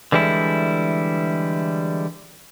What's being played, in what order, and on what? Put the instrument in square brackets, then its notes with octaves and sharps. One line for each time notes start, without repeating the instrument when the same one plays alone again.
[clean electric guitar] D3 E3 G3 G#3 E4